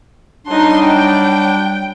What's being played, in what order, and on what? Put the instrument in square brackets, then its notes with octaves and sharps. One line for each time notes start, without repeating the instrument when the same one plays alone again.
[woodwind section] F#3 G3 D4 [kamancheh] D#4 C6
[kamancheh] G5